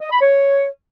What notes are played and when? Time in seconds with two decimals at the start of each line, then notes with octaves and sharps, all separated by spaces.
0.01 D#5
0.11 B5
0.21 C#5